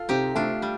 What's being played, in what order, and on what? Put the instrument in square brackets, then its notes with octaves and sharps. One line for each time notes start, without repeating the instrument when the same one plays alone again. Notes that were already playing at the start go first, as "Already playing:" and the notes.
Already playing: [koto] F4 A4
[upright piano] C3 [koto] D#4 G4
[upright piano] A3 [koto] D4 F4
[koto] G3